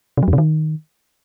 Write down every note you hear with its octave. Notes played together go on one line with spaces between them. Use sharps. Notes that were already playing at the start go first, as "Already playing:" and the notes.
C3
F#3
F2
C3
D#3